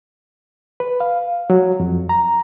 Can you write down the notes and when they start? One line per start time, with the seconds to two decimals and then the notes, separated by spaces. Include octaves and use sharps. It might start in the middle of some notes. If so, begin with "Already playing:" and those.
0.80 B4
1.00 F5
1.50 F#3
1.80 F2
2.09 A#5